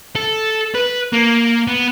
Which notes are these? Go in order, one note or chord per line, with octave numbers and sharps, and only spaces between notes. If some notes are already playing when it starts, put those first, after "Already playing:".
A4
B4
A#3
B3